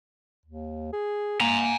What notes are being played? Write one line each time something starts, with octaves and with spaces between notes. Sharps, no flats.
D#2
G#4
A#3 G#5 A#5